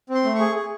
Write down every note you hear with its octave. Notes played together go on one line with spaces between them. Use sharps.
C4
C6
A3
G#4 C#6
G#4